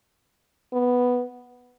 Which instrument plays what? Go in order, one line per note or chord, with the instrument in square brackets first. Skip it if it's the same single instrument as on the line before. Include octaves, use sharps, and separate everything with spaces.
[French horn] B3